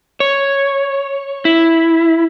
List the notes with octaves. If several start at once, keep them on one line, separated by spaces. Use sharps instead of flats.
C#5
E4